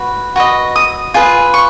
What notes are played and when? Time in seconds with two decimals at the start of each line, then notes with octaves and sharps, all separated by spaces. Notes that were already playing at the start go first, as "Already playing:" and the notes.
Already playing: F#4 B4
0.36 F#4 B4 D#5
0.76 D#6
1.14 F4 G#4 B4
1.54 C#6